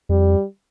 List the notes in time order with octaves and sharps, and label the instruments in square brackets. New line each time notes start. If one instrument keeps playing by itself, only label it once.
[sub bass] F2 [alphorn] G3